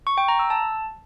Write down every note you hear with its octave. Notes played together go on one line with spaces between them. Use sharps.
C#6
G5
A#5
E6
A5